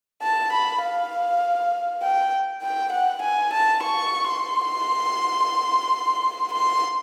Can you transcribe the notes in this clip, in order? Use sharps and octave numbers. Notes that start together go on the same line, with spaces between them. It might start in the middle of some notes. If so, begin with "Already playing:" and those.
A5
B5
F5
G5
G5
F#5
G#5
A5
C#6
C6
C6